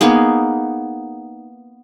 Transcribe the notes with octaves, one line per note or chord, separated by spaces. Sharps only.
A#3 B3 D#4 G#4